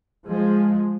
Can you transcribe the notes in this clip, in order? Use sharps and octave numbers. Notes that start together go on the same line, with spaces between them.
F3 G#3